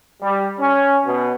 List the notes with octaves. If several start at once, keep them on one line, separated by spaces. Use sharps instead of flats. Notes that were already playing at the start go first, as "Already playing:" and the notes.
G3
C#4
B2